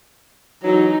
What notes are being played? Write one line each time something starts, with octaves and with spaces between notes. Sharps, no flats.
E3 F#3 D#4